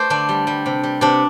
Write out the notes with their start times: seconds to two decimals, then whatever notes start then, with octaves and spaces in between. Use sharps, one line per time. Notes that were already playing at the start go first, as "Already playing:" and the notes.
Already playing: A3 C5 D5
0.10 D3 D4
0.29 G3
0.47 G3
0.66 C3
0.84 G3
1.01 C3 D4